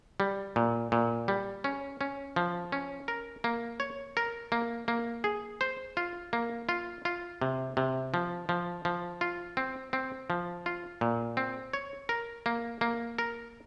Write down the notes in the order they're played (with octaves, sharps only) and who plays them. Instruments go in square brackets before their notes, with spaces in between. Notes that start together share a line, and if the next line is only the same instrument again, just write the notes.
[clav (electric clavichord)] G3
A#2
A#2
G3
C#4
C#4
F3
C#4
A#4
A#3
C#5
A#4
A#3
A#3
G#4
C5
F4
A#3
F4
F4
C3
C3
F3
F3
F3
F4
C4
C4
F3
F4
A#2
C4
C#5
A#4
A#3
A#3
A#4